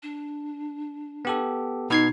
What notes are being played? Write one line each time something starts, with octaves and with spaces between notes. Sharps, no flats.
D4
B3 G4 A4
B2 D#4 G#6 C7